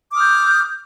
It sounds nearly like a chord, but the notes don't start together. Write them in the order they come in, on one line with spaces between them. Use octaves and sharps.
D6 D#6 F6 G6